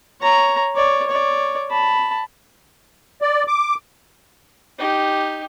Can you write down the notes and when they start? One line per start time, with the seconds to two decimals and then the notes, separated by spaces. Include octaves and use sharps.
0.21 C#5 A#5
0.75 C#5 D5
1.07 C#5 D5
1.70 A5 B5
3.22 D5
3.48 D6
4.79 D#4 G4